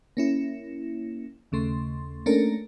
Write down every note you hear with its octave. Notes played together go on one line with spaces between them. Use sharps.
A#3 C#4 E4
D#2 C#3 A3 C6
A3 A#3 C#4 D4 A4 A#4